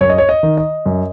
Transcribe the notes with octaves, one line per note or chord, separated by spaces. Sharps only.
F#2 C#5
D#5
C#5
D#5
D#3
D#5
F#2